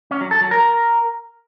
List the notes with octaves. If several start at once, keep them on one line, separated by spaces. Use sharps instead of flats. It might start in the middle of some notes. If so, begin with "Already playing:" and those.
C#4
F#3
A4
F#3
A#4